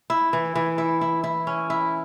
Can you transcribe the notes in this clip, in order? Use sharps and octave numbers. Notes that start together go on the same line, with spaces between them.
E4
E3
E3
E4
E4
E4
C#4
E4